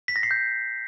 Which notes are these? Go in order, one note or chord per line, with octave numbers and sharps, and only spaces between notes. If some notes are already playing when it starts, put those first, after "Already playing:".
B6
A#6
C7
G6